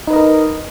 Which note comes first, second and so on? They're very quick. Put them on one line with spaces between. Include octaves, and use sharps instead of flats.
D#4 B4 D#5 A#4